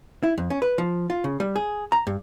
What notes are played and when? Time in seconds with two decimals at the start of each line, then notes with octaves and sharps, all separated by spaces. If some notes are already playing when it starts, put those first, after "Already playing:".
0.23 E4
0.38 F2
0.50 C#4
0.62 B4
0.78 F3
1.10 F4
1.24 C#3
1.40 G3
1.56 G#4
1.92 A#5
2.07 G2